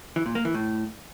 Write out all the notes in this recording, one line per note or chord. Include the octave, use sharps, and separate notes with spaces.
E3
A#2
A#3
E3
A2